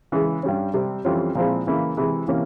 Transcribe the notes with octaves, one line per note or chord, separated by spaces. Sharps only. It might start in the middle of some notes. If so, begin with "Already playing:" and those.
C#3 E3 G#3
G2 G3 C#4
C3 G3 C4
F2 E3 G3 C#4 F4
A#2 F3 G#3 C4 E4
C#3 E3 A#3 E4
C3 E3 G#3 E4
C3 E3 A#3 C#4